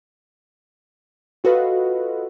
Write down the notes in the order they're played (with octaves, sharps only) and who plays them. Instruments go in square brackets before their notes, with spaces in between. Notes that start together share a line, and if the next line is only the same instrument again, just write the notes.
[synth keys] F4 F#4 A4 B4 D#5 F5